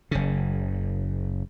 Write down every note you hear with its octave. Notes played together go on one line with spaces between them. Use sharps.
F#1 C#3